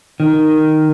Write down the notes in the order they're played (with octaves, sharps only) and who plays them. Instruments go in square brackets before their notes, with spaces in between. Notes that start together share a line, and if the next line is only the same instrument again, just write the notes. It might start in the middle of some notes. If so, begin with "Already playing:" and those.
[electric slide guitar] D#3